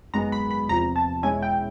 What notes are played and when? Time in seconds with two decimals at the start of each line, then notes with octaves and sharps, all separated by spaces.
0.14 G#1 F#2 D#3 G#3 B3 A#5
0.32 B5
0.51 B5
0.69 E2 C3 F3 A#5
0.96 A5
1.23 E2 B2 G#3 C#4 E4 G#5
1.42 G5